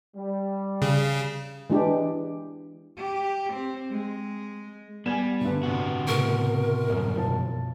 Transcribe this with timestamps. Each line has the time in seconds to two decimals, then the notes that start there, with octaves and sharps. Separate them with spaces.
0.16 G3
0.82 C#3
1.70 E3 G#3 D4 G4
2.98 G4
3.54 C4
3.91 G#3
5.06 G3 B3 G#5 G#6 E7
5.41 D2 G2 B4
5.63 C3 F#4
6.08 A2 C#3 B3 A#4 C#6
6.90 C2 F#2 C3
7.17 B1 F3 A5